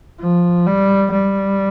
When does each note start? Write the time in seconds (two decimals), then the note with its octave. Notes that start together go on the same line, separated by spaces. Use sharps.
0.20 F3
0.66 G3
1.12 G3